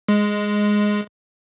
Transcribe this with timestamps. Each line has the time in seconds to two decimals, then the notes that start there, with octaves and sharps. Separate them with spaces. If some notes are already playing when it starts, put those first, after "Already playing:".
0.09 G#3